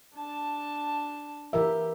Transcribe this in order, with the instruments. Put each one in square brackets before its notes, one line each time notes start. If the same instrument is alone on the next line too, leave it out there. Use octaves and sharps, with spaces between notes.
[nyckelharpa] D4 A5
[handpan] E3 A#4 E5 [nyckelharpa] G4